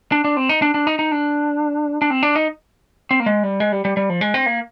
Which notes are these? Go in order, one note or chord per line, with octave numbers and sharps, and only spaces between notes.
D4
D4
C4
D#4
D4
D4
D#4
D#4
D4
D4
C4
D4
D#4
C4
A#3
G#3
G3
G#3
G3
G3
G3
F3
G#3
C4
A#3